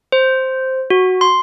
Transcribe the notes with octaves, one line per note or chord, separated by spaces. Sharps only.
C5
F#4
C6